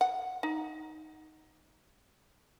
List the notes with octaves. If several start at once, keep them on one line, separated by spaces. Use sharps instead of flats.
F#5
D#4